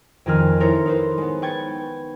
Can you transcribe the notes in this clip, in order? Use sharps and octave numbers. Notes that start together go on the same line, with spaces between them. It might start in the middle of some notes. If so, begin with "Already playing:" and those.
F2 D#3 G#4 A#4 F6
D#4 E4 A4 A#4 C5 C#5
D#4 B4 C5
G#3 B3
B4 G5 C#6 G#6 A6